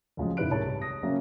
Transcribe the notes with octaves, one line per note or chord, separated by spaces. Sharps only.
D2 C#3 F3 F#3 G#3
F#1 D#3 E4 B4 F#6 D7
C2 G#2 G#4 A#4 C#5 A5
G4
D#6 A#6
C#3 F#3 A#3 C#4 E5